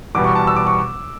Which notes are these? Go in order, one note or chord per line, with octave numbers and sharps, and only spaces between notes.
E2 B2 G3 B3 D6
C#6
A5
E6
D6
C#6